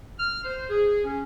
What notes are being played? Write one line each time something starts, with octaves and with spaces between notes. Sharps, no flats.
F6
C5
G#4
C#4